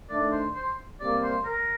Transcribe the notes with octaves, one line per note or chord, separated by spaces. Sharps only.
D#3 A3 D4 D5
C5
C5
C3 G3 A#3 D5
C5
A#4